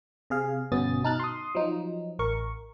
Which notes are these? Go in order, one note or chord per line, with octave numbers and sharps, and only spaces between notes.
C3 G#4 F5
G1 B2 B3 C#4 D#6 A6
B2 D#4 A5 F6 F#6 A6
C6 D#6
F3 F#3 D#4
A1 A#4 C#6